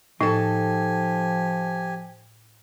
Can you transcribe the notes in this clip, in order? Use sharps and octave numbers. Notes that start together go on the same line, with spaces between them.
A2 F3 D#4 G4 A4 G#5